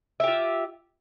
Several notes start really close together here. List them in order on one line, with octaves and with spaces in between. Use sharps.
E5 G4 F4